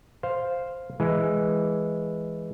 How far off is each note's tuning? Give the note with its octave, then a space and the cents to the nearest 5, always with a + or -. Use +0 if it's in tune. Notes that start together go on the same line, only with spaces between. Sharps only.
C5 +0 F5 +0
E3 +0 G#3 +0